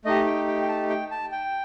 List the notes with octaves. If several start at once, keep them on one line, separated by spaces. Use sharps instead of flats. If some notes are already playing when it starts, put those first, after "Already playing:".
A3 D#4 G4 D#5
G5
G5
G5
A5
G5
A5
G5